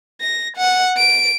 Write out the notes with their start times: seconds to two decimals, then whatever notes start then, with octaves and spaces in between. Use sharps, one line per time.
0.21 A#6
0.57 F#5
0.97 D7